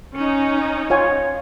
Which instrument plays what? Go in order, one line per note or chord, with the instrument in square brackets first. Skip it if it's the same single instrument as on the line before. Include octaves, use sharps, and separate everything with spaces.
[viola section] C#4 D#4
[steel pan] F4 C#5 G#5